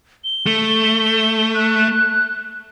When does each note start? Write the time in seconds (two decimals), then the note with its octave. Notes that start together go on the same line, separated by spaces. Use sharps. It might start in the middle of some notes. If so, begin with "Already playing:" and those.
0.24 G7
0.46 A3
1.54 F#6